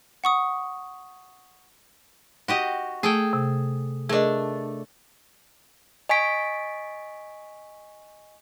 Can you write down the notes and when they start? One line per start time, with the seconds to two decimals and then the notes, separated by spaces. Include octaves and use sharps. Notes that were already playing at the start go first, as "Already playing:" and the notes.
0.24 F#5 C#6 D#6
2.48 F#4 G4 D#5
3.03 A3 G#4 A4 G5
3.33 C3
4.09 A3 D4 G#4 A#4 D#5
6.09 D#5 G#5 C#6 B6 D7